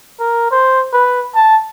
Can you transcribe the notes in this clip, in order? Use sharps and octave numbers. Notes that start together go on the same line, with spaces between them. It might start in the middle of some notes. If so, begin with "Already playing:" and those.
A#4
C5
B4
A5